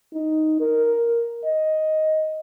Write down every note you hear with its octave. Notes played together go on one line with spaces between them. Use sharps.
D#4
A#4
D#5